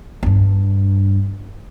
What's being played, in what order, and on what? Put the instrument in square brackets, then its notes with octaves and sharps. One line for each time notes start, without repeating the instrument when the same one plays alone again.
[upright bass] G2 D4